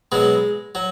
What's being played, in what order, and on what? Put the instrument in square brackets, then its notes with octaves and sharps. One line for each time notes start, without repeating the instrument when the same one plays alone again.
[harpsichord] B2 F#3 G#3
F#3